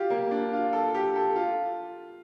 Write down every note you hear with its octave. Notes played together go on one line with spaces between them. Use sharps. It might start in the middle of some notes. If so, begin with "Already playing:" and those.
Already playing: F4 G4
A#3
D4
F4
A4
G4
A4
F4